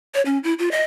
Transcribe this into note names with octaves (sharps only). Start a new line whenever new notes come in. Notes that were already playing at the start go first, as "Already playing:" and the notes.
C#5
C#4
E4
F4
D#5